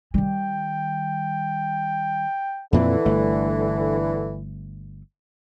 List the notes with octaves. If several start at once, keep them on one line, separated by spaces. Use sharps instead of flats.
D#3 G3 G5
F2 A#2 D3 E3 C4
G1 A3